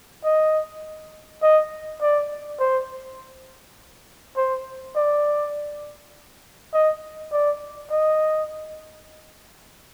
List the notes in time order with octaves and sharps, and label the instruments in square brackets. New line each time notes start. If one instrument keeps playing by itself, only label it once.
[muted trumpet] D#5
D#5
D5
C5
C5
D5
D#5
D5
D#5